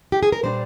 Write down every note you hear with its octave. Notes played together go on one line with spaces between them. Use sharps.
G4
G#4
A#4
A#2 G3 D4 C5